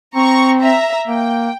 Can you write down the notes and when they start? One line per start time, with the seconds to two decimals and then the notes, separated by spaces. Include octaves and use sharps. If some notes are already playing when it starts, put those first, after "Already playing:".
0.15 C4 A#5 C#6
0.60 E5 A#5
1.08 A#3 G5